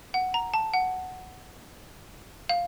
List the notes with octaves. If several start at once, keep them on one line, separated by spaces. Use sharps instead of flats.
F#5
A#5
A5
F#5
F5